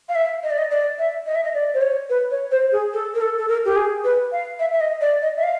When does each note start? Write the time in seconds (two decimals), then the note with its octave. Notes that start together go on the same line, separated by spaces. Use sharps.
0.09 F5
0.15 E5
0.43 D#5
0.50 D5
0.58 D#5
0.71 D5
0.99 E5
1.26 D#5
1.35 E5
1.44 D#5
1.54 D5
1.74 C5
1.82 C#5
2.10 B4
2.31 C#5
2.51 C5
2.72 G#4
2.93 A4
3.14 A#4
3.21 A4
3.38 A4
3.49 A#4
3.65 G4
3.76 G#4
4.04 B4
4.32 F5
4.59 E5
4.72 E5
4.81 D#5
5.01 D5
5.22 D#5
5.37 E5
5.43 F5